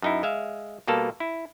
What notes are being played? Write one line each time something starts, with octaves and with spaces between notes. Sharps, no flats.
F#2 D#4 E4
G#3 E5 F5
B2 G3 A#3 A4 A5
E4